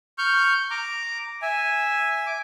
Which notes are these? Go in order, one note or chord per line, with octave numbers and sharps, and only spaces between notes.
C#6 F6 G6
A#5 D6
E5 G#5
D6